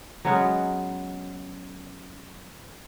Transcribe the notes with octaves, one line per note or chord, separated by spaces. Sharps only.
F#3 G#3 B3 C#4